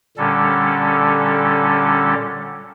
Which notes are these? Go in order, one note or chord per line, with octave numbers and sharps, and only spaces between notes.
A#2 D3 G3 C#4 A4